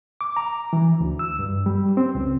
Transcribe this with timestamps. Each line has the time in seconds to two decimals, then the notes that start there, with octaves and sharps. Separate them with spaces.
0.21 D6
0.36 A#5
0.73 E3
1.00 D2
1.19 E6
1.39 G2
1.66 G3
1.97 C4
2.15 C#2